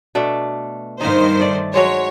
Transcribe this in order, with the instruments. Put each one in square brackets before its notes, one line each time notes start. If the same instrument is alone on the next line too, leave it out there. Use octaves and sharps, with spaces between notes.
[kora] B2 A3 D4
[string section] G2 D#3 C5 [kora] D#4 F5
[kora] A3 D5
[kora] F#3 G#3 C5 [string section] C#5